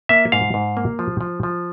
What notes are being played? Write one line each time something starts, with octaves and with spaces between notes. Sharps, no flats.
A#3 E5
G#2 F5
G#2
A#3
F3
F3
F3